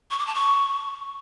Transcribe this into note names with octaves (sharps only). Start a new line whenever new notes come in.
C#6
D6
A5
C#6